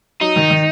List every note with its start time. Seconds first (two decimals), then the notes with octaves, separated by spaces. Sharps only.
0.21 F#3 D#4
0.36 D#3
0.50 D#3